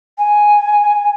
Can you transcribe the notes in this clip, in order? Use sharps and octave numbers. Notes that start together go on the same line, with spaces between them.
G#5